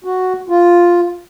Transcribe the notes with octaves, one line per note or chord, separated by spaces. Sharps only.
F#4
F4